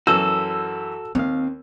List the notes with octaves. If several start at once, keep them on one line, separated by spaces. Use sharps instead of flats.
F#2 E3 F#4 A4 E6
D#2 C4 F5